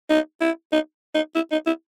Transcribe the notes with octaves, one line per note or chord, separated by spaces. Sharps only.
D#4
E4
D#4
D#4
E4
D#4
E4